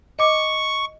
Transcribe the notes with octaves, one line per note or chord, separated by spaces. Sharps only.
D#5 C#6 D6